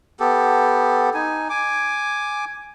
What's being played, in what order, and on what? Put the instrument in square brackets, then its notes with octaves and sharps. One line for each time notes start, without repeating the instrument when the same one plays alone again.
[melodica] B3 G4 A4
D#4 G#5
G#5 D6